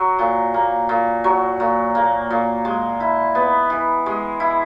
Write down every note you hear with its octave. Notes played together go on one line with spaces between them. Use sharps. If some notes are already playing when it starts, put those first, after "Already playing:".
Already playing: F#3
A#2
A#3
A#2
F#3
A#2
A#3
A#2
G#3
E4
B3
E3
G#3
E4